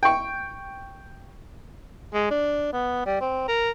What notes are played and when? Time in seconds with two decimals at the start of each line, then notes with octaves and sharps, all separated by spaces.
0.03 G5 C#6
2.14 G#3
2.31 D4
2.73 B3
3.06 G3
3.21 C4
3.48 A#4